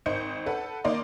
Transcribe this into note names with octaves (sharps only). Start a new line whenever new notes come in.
G#1 C5 D#5 G6 C#7
A4 B4 F#5
D#3 A#3 D5 D#5 C6